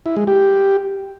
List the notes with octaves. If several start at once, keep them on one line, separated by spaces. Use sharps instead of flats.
E4
G#3
G4